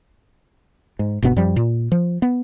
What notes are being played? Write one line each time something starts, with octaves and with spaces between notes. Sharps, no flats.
G#2
F#1 G2 B2 B3
F#2 F3 G3
A#2
F3
B3